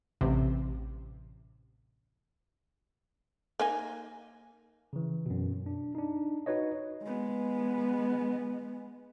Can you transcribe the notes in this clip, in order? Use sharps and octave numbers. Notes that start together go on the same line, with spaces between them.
A1 C3
A#3 D#4 G#5
C#3 E3
F#2 B2
D4
D4 D#4
D#4 F#4 B4 C#5 D#5
G#3 B3